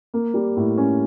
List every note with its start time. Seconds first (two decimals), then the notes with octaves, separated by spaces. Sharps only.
0.14 A#3
0.34 G3
0.57 A2
0.78 C#4